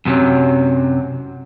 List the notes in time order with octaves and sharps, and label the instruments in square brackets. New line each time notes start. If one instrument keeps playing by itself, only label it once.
[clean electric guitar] F#2 C3 E3 F#3